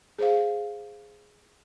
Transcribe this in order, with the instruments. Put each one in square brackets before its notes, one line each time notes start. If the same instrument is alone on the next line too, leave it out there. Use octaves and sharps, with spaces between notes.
[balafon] G#4 C5 F5